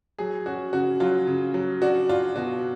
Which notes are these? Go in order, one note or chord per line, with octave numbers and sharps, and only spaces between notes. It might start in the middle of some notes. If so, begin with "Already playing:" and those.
F#3 G#4
C#4 F#4
C#3 F#4
F#3 F4
C#3
F#3
D4 F#4
D4 F4
B2 F#4